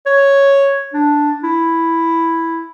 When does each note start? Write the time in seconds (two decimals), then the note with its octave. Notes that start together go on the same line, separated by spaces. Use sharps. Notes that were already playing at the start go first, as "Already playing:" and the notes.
0.06 C#5
0.94 D4
1.43 E4